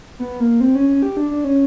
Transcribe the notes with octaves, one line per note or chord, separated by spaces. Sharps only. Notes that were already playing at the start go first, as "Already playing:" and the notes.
B3
A#3
C4
C#4
C#4
G4
D4
D4
C#4